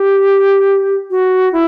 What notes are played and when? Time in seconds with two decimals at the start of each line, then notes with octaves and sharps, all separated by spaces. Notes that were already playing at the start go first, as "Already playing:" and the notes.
Already playing: G4
1.10 F#4
1.53 E4